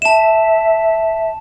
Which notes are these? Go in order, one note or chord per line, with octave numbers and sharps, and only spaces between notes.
E5 A5 E7